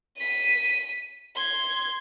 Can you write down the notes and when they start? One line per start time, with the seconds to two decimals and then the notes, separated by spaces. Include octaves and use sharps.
0.17 B6 D#7
1.36 C6 G#6